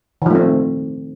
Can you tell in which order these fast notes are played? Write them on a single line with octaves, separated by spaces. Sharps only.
D#3 F3 A3 C4